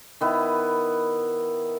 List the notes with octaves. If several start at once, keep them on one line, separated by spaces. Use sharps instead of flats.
D#3 B3 E4